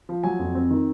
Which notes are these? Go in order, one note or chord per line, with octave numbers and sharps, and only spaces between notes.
F3
F#3 G#5
F2
C4
D#3